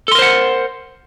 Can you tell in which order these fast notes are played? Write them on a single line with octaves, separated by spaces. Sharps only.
A4 C6 A#4 C5 F#5